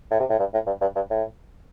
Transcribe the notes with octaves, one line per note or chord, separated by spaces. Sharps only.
A2
C3
A2
G2
A2
G2
G2
G2
A2